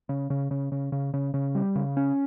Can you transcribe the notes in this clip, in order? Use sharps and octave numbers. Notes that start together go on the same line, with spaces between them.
C#3
C#3
C#3
C#3
C#3
C#3
C#3
G3
C#3
C#4